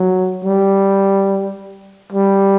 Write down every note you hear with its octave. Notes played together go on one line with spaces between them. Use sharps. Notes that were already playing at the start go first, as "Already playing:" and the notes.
Already playing: F#3
G3
G3